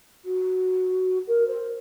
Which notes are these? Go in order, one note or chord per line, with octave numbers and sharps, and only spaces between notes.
F#4
A#4
C5